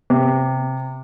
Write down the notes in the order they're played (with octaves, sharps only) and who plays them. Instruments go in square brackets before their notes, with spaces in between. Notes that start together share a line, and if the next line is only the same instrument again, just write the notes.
[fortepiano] C3